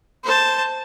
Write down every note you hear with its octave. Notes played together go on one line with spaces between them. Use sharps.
C5 A5